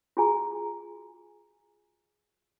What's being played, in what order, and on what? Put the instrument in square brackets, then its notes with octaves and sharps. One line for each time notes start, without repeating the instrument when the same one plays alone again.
[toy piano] F4 F#4 G#4 G#5 A#5